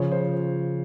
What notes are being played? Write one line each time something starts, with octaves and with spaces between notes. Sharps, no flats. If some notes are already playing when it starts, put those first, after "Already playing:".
Already playing: C#3 F3 C#5
C5